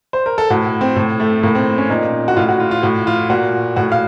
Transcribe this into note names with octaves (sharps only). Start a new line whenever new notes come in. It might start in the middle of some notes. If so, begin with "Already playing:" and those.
C5
A#4
A4
A2 F#4
C4
A2
A3
A2 A#3
C4
C#4
A#2 D#4
F#4
A2 F4
F#4
F4
F4
A2 F#4
F4
A#2 F#4
A2 F#4
F5